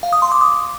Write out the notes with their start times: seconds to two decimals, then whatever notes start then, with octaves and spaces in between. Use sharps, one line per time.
0.03 F5
0.13 D#6
0.22 C6
0.32 D6
0.41 D#6